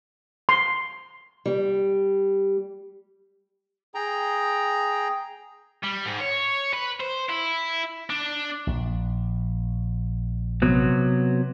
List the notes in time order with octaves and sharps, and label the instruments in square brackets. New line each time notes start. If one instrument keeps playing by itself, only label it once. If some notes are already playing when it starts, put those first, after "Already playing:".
[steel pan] C6
[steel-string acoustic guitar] G3
[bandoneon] G#4 G5 A#5
[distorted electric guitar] G3
G#2
C#5
B4
C5
E4
D4
[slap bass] A#1
[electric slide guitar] C3 F#3 B3